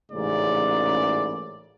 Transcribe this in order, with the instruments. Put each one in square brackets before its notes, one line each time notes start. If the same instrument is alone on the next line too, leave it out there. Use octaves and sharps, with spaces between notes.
[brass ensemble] A1 G#2 C#3 A#3 D5